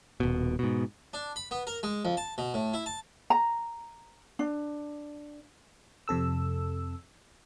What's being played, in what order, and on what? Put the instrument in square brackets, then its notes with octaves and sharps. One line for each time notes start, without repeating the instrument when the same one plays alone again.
[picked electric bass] D#1 B2
G#2 B2
[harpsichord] D4
B5
B3
A#4
G#3
F2
A5
B2
A2
E4
A5
[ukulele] A#5
D4
[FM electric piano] F2 C3 A4 E6